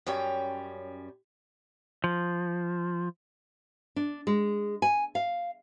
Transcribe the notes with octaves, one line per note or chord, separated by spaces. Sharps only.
F#2 G3 C#4 G5
F3
D4
G#3
G#5
F5